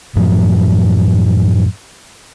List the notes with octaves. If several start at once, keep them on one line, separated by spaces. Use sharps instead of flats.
F#2 A2 F3